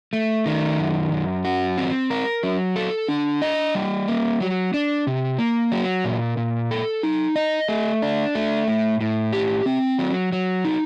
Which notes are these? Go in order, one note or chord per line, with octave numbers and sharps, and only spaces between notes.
A3
D#3
F#2
F#2
F#4
C4
A#4
F#3
A4
D4
D#5
G3
A#3
F#3
D4
C3
A#3
F#3
A#2
A#2
A4
D#4
D#5
A3
D4
A3
A2
A2
G4
C4
F#3
F#3
D#4